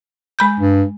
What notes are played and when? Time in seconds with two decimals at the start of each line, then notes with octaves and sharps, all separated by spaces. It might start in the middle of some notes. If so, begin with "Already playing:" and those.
0.39 G#3 B5 G6
0.60 G2